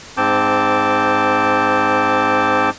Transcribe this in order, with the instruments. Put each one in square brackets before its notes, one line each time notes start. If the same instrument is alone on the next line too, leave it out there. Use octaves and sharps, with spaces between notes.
[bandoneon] G#2 C4 A5 D6 G6